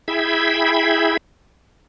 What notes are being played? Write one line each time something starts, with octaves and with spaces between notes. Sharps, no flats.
E4 G#4 E5 G5 B5